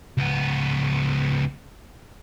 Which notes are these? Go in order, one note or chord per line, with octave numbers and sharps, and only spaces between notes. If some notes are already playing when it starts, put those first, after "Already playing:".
C#2 B3